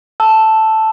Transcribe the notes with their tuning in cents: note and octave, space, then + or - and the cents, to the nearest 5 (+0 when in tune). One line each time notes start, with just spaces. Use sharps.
A5 +0 E6 +0